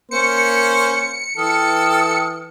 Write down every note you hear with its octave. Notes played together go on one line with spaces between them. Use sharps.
A#3 C#4 C5 C#7
E3 A4 G5 D#6 F6